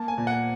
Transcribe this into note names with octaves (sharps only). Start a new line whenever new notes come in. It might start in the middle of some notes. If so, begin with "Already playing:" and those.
Already playing: A#3 A5
G#5
A#2
F#5